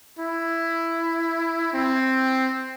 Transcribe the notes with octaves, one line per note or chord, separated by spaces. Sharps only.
E4
C4